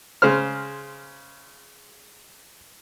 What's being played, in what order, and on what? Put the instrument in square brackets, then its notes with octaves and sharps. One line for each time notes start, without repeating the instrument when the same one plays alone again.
[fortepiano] C#3 G#3 C5 F6